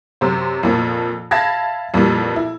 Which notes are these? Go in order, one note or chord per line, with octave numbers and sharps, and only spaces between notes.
F#2 C3 C5
F2 A#2 F3
E5 F5 A5 B5 G#6 A#6
F2 A#2 E3 G3
E4